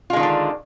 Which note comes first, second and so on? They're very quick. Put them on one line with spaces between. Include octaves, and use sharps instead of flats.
F4 G#3 D#3 D4 D3